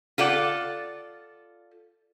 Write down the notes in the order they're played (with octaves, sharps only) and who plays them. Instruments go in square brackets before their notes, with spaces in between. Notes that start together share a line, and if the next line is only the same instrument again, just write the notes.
[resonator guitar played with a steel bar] F4 A4 D5 F#5